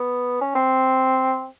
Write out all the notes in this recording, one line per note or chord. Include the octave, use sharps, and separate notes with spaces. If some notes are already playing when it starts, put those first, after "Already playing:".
Already playing: B3
C#4
C4